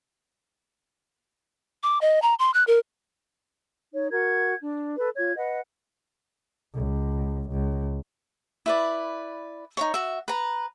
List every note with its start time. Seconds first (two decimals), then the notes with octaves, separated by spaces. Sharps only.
1.83 D6
2.01 D#5
2.22 A#5
2.39 C6
2.54 F#6
2.67 A#4
3.93 D#4 C#5
4.12 F#4 A#4 F#5 G#6
4.61 D4
4.98 A4 B4
5.17 F4 C#5 G#6
5.36 B4 D#5 F#5
6.75 C#2
7.51 C#2
8.66 E4 B4 D5
9.77 D#4 F#4 C#5
9.94 F#4 E5
10.28 B4 A#5